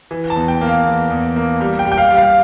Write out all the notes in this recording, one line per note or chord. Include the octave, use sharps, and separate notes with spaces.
E3
A5
E2
G5
A#3
F5
E2
E2
A#3
G3
G5
G3
G5
F5
G3
F5